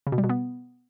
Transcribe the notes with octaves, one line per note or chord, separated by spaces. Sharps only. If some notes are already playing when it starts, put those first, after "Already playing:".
C#3
B2
G3
B2
B3